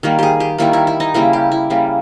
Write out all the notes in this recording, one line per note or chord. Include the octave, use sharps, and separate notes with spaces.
D#3 G3 A#3
G4 G#4
G4
D#3 G3 A#3 E4
E4
E4
D#4
C#3 G3 A#3 E4
G4
E4
C#3 G3 A#3